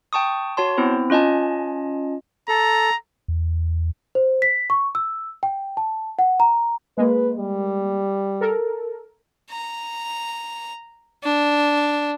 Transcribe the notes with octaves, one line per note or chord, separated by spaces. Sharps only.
G5 A5 C#6 D#6
F#4 C#5 A5 C6
B3 C4 E4 C5
C#4 F4 D#5 G#5 A5
A4 A#5
E2
C5
B6
C#6
E6
G5
A5
F#5
A#5
G#3 A#3 B4
G3
A4 A#4
A#5
D4